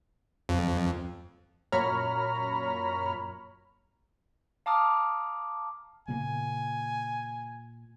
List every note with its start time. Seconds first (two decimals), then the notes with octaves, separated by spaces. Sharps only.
0.49 F2
1.72 F#2 A#2 C#5 A#5 B5 F6
4.66 F5 A5 A#5 D6 D#6 F6
6.08 A#2 C#3 A#3 G#5